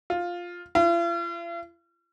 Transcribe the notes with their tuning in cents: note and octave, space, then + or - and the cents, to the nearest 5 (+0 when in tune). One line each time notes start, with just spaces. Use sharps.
F4 +5
F4 -45